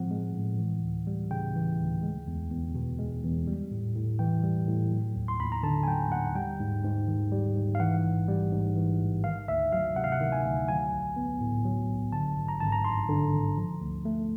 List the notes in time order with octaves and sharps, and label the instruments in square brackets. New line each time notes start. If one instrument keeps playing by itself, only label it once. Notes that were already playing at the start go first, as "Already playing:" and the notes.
Already playing: [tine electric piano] A2 F3 G#3 C4 F#5
G#3
A2
E3
D2
G3
C#3 G5
E3
D2
G#3
E2
E2
B2
G#3
E2
G3
A2
A2
E3 G5
G3
A2
F#3
D#2
C6
D#2 B5
A#5
D3 A5
G#5
F#3 G5
D#2 F#5
G3 G5
G#2
G#2
D#3
G3
G#2
F5
E3 F#5
A1
G3
G#2
E3
A1
D#3 F5
D2 E5
F#3 F5
C3 F#5
F5
F#5
D#3
G#5
D2
F#3 G#5
B1
B3
A2
F#3
B1
D3 A5
G#1
A#5
G#1 A5
A#5
G2 C6
D3
G#1
F3
D2
A3